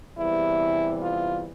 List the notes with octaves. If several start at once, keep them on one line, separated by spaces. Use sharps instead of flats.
E2 C3 E3 G3 E4
F4